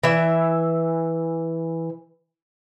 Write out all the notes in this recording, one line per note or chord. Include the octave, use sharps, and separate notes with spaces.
E3 E5